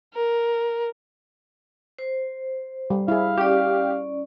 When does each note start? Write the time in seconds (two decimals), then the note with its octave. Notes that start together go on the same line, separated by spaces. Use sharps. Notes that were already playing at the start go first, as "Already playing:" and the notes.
0.14 A#4
1.98 C5
2.90 G3
3.08 E4 G#4 F5
3.37 C#4 G4 D5